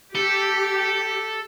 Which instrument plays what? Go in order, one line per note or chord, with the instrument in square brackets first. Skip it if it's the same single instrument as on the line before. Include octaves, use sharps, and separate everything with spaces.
[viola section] G4 [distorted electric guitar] A4